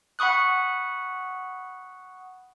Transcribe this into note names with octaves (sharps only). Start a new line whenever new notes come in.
F#5 B5 C#6 D#6 F#6